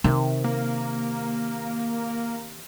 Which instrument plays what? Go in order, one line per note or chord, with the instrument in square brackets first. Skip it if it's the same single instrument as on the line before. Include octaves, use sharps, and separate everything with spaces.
[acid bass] C3 [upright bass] D#3
[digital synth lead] A#3